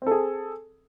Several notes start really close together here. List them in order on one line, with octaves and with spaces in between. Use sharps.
C4 A4 G#4